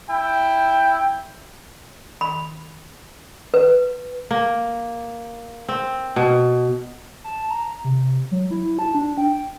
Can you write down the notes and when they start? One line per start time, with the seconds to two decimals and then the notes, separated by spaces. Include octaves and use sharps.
0.11 E4 G5
2.21 B5
3.54 B4
4.31 A#3
5.69 C4
6.16 B2
7.24 A5
7.50 A#5
7.84 C3
8.31 F#3
8.51 E4
8.79 A5
8.95 D4
9.18 G5